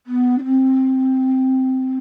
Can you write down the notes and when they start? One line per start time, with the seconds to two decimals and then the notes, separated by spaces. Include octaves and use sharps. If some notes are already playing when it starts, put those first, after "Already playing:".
0.06 B3
0.37 D4
0.43 C4